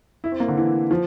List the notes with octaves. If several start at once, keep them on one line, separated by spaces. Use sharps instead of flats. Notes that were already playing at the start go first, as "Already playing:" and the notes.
E4
C4
A#3
D3
E3
F3